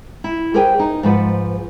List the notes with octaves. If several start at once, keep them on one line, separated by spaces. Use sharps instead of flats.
E4
G4 G#4 A#4 C5 G5 G#5
D#4
G#2 F3 B4 F#5